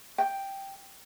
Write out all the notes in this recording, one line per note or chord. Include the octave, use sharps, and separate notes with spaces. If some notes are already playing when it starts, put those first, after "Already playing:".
G5